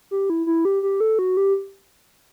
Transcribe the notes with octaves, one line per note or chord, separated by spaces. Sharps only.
G4
E4
E4
G4
G4
A4
F#4
G4